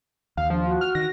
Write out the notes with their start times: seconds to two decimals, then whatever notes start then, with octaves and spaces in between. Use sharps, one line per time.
0.37 D#2 F5
0.50 F3 D4
0.65 F#4
0.81 F6
0.95 D#3 A#6